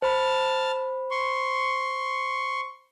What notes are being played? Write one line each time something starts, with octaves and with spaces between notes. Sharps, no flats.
C5 A5 B5 F6
C6 C#6